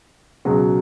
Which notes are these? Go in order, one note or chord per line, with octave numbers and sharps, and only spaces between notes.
C#2 B2 F#3